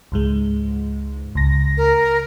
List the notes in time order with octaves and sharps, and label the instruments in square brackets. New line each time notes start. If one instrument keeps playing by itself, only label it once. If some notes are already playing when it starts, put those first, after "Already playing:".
[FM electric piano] C#2 G#2 G#3
C#2 A#6
[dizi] A#4